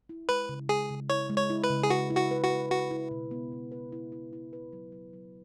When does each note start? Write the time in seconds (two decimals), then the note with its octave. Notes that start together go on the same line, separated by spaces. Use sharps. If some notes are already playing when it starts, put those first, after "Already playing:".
0.09 E4
0.28 G#3 B4
0.49 C#3
0.69 G#3 G#4
0.90 C#3
1.10 E4 C#5
1.30 G#3
1.37 C#5
1.50 E4
1.64 B4
1.70 C#3
1.83 G#4
1.90 F#4 B4
2.10 E4
2.17 F#4
2.31 B4
2.44 F#4
2.50 B4
2.71 F#4 B4
2.91 E4
3.11 B2
3.31 B3
3.52 B2
3.72 B4
3.92 E4
4.12 E4
4.33 E4
4.53 B4
4.73 F#3
4.92 F#3
5.13 F#3